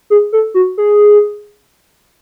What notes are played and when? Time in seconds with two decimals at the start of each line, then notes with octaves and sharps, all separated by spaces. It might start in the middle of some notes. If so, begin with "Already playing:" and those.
0.10 G#4
0.32 A4
0.54 F#4
0.78 G#4